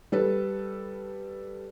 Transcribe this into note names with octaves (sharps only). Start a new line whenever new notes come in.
G3 A4 B4